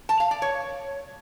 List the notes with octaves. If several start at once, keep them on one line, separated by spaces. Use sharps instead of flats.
A5
F5
D5
C#5